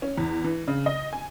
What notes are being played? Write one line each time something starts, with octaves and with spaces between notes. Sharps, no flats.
C#4
E2
E3
C#3
D#5
G#5